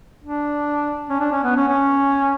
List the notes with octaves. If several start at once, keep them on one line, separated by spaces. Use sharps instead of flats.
D4
C#4
D4
C#4
B3
C#4
C#4